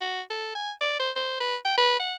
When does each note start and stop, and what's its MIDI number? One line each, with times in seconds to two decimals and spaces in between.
0.01 0.21 66
0.30 0.54 69
0.55 0.72 80
0.81 0.97 74
1.00 1.11 72
1.16 1.36 72
1.41 1.56 71
1.65 1.77 79
1.78 1.99 71
1.99 2.15 78